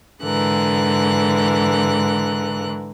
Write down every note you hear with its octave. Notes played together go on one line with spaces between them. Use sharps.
G#2 D3 E3 A#4 F#6